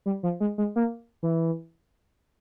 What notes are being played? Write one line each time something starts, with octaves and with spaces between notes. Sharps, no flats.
G3
F3
G#3
G#3
A#3
E3